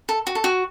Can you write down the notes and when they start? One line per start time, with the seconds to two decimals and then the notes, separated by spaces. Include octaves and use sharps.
0.09 A4
0.27 F#4
0.35 A4
0.44 F#4